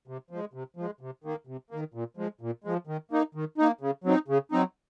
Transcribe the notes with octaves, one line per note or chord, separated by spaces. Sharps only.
C3
F3 G#3
C3
F3 G#3
C3
D#3 A#3
C3
D#3 A#3
A#2
F3 G#3
A#2
F3 G#3
D#3
A#3 D#4
D#3
A#3 D#4
C#3
F#3 C4 D#4
C#3
F#3 C4 D#4